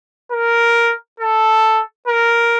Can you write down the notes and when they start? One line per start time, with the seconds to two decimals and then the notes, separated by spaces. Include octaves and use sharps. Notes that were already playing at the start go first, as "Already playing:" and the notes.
0.32 A#4
1.20 A4
2.08 A#4